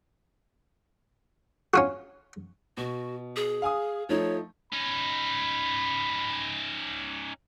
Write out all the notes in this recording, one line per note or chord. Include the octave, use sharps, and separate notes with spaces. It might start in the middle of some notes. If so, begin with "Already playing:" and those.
C#4 F4 F#4
B2 F#4
G#4
F5 G#5 D#6
F3 A3 D#4 C#5
C#4 D#4 B5